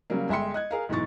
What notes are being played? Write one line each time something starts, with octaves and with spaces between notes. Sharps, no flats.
C#3 F#3 G3 A#3
G1 G#3 E5 G5 C6 C#7
D#5 F#6 G#6
G#4 A#4 F5
B1 G#2 B2 E3 C#6 A6